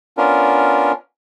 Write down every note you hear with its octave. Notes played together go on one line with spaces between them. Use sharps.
B3 C#4 D4 F4 A#4